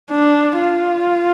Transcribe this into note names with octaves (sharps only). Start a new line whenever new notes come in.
D4
F4